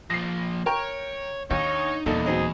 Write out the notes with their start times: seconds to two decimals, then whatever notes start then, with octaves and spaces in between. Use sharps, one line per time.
0.10 A#2 F3 A#6 C7
0.66 A#4 C#5 G5 A#5
1.51 D#2 D4 D#4 C#5
2.06 D#1 E2 A#2 D#4 A4
2.26 F#3 C4 D#4 G#4